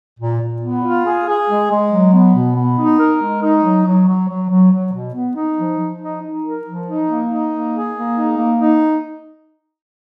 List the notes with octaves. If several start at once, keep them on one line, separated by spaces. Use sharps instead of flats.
A#2
A#2
B3
F4
G#4
G#4
G#3
G#3
F#3
B3
B2
B3
D#4
A#4
G#3
D#4
F#3
F#3
F#3
F#3
F#3
F#3
B2
B3
D#4
F3
F3
D#4
D#4
A#4
F3
D#4
A#3
D#4
A#3
G#4
A#3
D#4
A#3
D#4